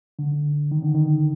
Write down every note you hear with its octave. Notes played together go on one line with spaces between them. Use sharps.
D3
D#3
D3
D#3